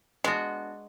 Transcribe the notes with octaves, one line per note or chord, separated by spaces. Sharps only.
G#3 B3 D4 F#4